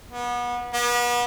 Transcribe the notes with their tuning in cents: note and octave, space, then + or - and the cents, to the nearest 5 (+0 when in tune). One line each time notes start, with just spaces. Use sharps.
B3 -30
B3 -35